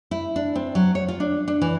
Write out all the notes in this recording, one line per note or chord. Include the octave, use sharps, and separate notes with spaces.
E4
D4
C4
F#3
C#5
F4
D4
D4
E3